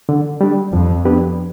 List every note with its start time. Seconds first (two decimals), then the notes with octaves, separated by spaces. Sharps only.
0.09 D3
0.41 G3 D4
0.73 F2 F3
1.05 B3 D4 G4 B4